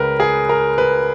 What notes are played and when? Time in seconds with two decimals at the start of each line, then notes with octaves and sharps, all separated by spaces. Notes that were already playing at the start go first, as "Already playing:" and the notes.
Already playing: C#2 C#3 A#4 B4
0.20 G#4
0.49 A#4
0.78 B4